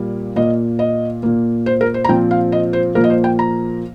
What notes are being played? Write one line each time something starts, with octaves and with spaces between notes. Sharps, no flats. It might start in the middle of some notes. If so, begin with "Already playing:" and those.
Already playing: A#2 G3 A#3
A#2 A#3 D#5
D#5
A#2 A#3
C5
A#4
C5
A#5
A#2 F3 C4 G5
F5
D#5
C5
A#2 F3 A#3 A#4
D#5
C5
G5
A#5